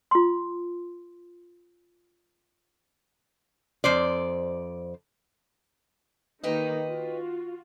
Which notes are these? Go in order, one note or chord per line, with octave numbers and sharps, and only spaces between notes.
F4 C6
F2 C5 D5
D#3 A#3 D#4 G4 B4 D#5
F4 F#4